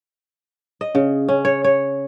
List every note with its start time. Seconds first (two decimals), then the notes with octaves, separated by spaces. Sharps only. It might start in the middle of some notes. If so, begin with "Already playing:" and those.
0.81 D#5
0.95 C#3
1.28 C#4
1.45 C#5
1.64 C#5